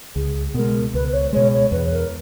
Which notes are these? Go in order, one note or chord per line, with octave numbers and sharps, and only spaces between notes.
C#2 G#4
B2 G#3 A#4
C#2 B4
B4
C#5
B2 G#3 C#5
C#5
E2 B4
A#4